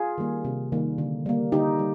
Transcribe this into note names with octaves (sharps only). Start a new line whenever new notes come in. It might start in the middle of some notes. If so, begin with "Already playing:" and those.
Already playing: F4 G#4
D#3 G3 A#3
C3
D#3 G3 A#3
D3
G3 A#3
D3 D#4 G4
G3